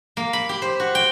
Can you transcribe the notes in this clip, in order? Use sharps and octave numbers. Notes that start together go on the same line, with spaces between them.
A#3
B5
G4
C5
F#4
G5